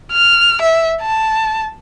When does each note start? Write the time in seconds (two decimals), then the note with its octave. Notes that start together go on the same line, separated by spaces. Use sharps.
0.12 F6
0.62 E5
1.02 A5